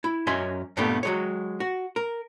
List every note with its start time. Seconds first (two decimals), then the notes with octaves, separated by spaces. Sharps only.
0.04 E4
0.27 F#2 C#4 D#5 E5 G#5 C6
0.77 G2 A#2 G3 A3 B3 G4
1.03 F#3 G#3 C#5
1.60 F#4
1.96 A#4